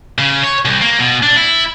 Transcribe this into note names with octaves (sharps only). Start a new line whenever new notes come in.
C#3
C#5
C2
A#3
B2
D4
E4